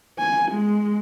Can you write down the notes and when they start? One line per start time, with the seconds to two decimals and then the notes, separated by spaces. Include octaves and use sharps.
0.19 G#5
0.51 G#3